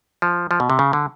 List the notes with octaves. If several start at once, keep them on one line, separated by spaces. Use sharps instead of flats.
F3
F3
B2
C3
C#3
D3